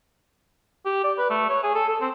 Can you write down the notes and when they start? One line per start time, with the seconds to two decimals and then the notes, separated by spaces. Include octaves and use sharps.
0.86 G4
1.04 D5
1.18 B4
1.31 A3
1.49 C#5
1.64 G#4
1.75 A4
1.89 A4
2.01 C4